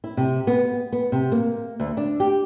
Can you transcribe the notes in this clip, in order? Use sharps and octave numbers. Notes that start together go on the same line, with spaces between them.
E4
C3
B3
B3
C3
A#3
D2
D4
G4